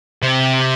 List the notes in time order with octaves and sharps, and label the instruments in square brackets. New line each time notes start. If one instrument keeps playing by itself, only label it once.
[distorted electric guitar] C3